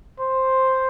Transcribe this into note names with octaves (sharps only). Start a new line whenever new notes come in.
C5